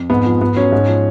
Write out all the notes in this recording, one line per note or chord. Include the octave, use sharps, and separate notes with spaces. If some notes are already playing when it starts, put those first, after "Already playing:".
Already playing: F2
G#2 B3
F3
G#2 B3
F#3 C#4
G#2
F3